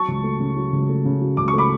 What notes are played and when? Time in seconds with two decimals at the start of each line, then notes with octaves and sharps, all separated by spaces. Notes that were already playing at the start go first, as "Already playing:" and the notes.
Already playing: F#3 A5 C#6
0.08 C#2
0.24 A3
0.40 C#3
0.56 F#3
0.73 C#2
0.89 A3
1.05 C#3
1.21 F#3
1.37 C#2 D6
1.48 C#6
1.54 A3 B5 D6